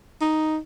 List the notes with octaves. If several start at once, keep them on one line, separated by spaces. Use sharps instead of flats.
D#4